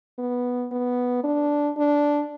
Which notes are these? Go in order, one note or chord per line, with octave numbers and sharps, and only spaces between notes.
B3
B3
D4
D4